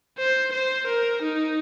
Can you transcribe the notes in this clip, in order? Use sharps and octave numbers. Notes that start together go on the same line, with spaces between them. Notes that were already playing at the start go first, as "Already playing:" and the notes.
C5
C5
A#4
D#4